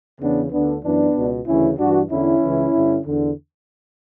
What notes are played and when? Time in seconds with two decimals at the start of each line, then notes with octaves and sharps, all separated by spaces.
0.21 E2 C#3 E3 B3 D4
0.52 D2 D3 B3 D4
0.84 F#2 E3 B3 D4
1.16 C#2 B2
1.47 D2 C#3 E3 C#4 E4
1.79 G2 E3 D4 F#4
2.10 E2 D3 C#4 E4
2.42 C#2 C#3 E3
2.73 G2 D3
3.05 E2 D3